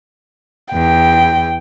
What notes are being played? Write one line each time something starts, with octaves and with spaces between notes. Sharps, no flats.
E2 G5